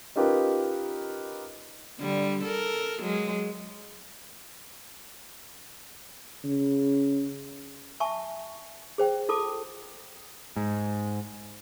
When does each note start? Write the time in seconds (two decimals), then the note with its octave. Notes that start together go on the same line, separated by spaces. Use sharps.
0.16 C#4 D#4 F4 G4 A#4 B4
1.98 D3 G3
2.44 A4 A#4
3.02 F#3 G#3
6.44 C#3
8.00 E5 G#5 A5 C#6
8.98 G#4 C5 G5
9.29 F4 A4 A5 D6
10.56 G#2